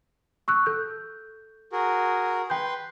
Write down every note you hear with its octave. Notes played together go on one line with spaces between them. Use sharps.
C#6 E6 F#6
A4 G6
F#4 G#4 A#4
B4 G5 C6 G6